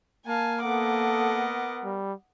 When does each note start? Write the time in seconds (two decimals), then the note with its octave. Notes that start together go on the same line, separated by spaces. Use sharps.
0.27 A#3 A#4 F5 G#5 A5
0.63 B3 A4 A#4 D#5 F#5 D6
1.84 G3